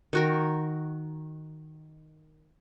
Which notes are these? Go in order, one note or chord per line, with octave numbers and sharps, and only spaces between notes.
D#3 F#4 A#4